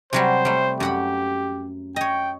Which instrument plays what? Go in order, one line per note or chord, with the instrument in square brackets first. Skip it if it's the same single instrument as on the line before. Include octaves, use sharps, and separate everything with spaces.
[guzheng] C3 F#3 G3 [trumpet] C5
[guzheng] G3 A3
[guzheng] F#2 F#5 B5 [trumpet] G4
[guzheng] C#5 D#5 [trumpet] G5